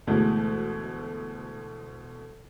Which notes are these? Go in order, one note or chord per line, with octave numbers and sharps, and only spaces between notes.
D2 B2 E3 G#3 A3